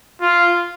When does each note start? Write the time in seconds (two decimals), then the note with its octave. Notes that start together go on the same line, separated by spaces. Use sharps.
0.22 F4